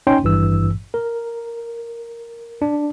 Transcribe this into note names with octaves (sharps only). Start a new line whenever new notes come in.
C#4 D#4 C#5 G5 C6
G#1 G2 E3 E6
A#4
D4